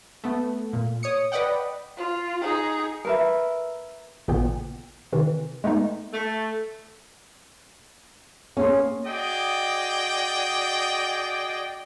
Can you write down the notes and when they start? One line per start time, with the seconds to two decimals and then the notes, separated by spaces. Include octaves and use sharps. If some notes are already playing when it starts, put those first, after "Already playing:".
0.24 A3 B3
0.73 A#2
1.03 C#5 D#6 C#7
1.32 B4 D5 D#5 F#5 G5
1.97 F4
2.41 D#4 G#4
3.05 A#4 B4 E5
4.28 A1 A#2 C#3 E3 B3 G5
5.13 C3 D#3 E3
5.64 G#3 A3 B3 D#4
6.13 A3
8.57 A#3 C#4 G#4 C6
9.06 F#4 G#4 D5 D#5 G5